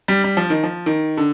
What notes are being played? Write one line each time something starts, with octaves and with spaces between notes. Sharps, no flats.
G3
G3
F3
D#3
F3
D#3
D3